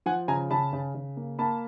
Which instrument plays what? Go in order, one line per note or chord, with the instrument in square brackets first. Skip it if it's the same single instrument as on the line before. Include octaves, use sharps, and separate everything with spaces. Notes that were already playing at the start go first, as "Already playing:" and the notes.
[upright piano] F3 F#5 G#5
C#3 G#5 A#5
C#3 A5 B5
C#3
C#3
A#3
A#3 A5 B5